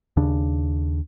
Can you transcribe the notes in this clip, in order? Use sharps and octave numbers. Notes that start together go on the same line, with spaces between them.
D#2 C#3 D4